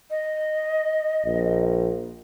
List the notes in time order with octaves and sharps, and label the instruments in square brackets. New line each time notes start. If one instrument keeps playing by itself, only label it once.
[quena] D#5
[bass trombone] A#1